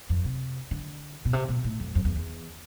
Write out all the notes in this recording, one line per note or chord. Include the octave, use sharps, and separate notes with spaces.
F2
C3
D3
B2
C3
B2
A2
F2
F2
E2
E2